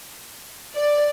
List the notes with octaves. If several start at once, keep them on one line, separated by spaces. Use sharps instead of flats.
D5